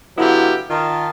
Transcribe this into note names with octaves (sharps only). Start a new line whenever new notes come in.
D3 F#3 B3 E4 F4 G4
D#3 F4 A5